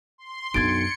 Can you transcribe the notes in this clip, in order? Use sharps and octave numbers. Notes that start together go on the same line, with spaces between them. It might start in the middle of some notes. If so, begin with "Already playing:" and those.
C6
B1 F#2 D4 G#6 A6 C#7 D7